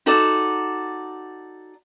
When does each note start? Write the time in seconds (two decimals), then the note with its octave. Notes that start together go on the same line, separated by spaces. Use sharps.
0.06 D#4 F#4 A4 D5